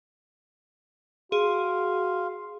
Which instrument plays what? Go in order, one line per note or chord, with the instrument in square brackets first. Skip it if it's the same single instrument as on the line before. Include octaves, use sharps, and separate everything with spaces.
[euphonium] F#4 [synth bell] G#4 [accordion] F5 C6